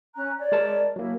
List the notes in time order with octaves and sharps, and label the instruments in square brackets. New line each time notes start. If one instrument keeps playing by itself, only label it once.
[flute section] C#4 A#5 F#6
C#5 D5
[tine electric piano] G#3 A#4 A5
[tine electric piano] F#3 A#3 [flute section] E4